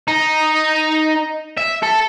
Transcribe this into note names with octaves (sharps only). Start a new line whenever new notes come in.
D#4
E5
A4